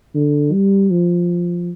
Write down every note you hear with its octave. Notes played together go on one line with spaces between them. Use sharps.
D3
G3
F3